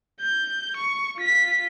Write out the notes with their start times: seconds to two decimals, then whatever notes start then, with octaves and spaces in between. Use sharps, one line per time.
0.21 G6
0.77 C#6
1.18 F4 B6